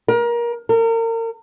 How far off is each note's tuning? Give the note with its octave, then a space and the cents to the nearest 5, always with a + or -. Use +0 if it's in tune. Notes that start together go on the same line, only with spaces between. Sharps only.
A#4 +25
A#4 -35